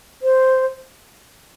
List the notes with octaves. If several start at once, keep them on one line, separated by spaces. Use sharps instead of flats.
C5